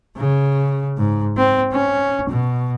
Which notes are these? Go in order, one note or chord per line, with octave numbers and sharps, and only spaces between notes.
C#3
G#2
C4
C#4
B2